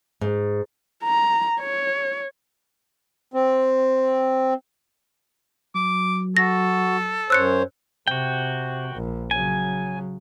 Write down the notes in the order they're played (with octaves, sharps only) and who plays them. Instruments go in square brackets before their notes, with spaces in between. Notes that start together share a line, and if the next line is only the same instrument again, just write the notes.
[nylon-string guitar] G#2
[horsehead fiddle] A#5
C#5
[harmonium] C4
[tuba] F#3 [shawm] D6
[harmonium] F#4 [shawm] A4 [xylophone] A#6
[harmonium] F#2 C5 C#5 [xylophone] E6 F#6 C#7
[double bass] C3 [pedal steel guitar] F#4 G5
[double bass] A#1
[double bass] C#3 F#3 [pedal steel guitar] G#5